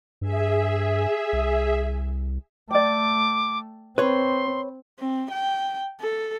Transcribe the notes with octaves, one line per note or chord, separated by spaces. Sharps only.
G2 G#4 E5
C2
A3 D5 G5 D6
C4 B4 C#5 C6
C4
G5
A4